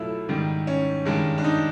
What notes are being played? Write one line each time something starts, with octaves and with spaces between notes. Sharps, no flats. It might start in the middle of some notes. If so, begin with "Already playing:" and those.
Already playing: B2 F#3 A3 E4 F4
G#2 D#3 G3
C#4
G2 D#3 G#3
D4
D#4